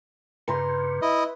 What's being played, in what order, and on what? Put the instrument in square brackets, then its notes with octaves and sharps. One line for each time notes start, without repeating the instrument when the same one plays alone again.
[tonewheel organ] G2 C#3 [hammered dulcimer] B4 A#5 C6
[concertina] E4 D#5